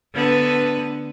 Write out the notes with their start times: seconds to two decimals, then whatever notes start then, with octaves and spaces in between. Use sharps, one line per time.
0.13 D3 B3 B4